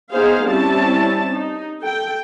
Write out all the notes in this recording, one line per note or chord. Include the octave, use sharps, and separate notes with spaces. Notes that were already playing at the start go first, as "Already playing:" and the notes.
B3 D#4 G#4 C5 F5
G3 C4 C#4 E4 A5
D#4
A4 G5